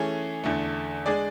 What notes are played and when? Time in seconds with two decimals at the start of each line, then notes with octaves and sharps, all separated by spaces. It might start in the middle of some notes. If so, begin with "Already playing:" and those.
Already playing: E3 A3 C#4 G#4
0.44 E2 D3 A3
1.06 G#3 D4 G#4 D5